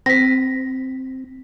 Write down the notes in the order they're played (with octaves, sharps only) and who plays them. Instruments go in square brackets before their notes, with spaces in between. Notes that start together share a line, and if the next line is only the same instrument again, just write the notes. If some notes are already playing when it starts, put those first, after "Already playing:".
[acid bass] C4 [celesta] A#6 B6